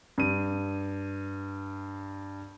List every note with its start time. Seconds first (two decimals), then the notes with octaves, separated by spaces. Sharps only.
0.18 G2 D#7